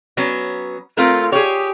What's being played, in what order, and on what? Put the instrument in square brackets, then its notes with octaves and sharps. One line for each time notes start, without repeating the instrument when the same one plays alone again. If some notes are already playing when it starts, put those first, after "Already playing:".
[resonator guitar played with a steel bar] F#3 B3 C#4
[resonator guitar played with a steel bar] A3 C4 A#4 [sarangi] F4
[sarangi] G4 [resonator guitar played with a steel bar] G#4 C#5